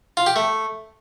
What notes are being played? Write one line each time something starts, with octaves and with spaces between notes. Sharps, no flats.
F4
G4
A3